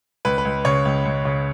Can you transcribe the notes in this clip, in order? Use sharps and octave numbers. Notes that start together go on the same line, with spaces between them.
C#2 B4
B4
C#2
C#3 C#5
C#2
C#2
C#3